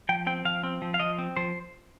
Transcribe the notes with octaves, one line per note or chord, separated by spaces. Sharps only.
F3 G5
C4 G5
F3 F5
C4
F3
F5
F3 D#5
C4
F3 C5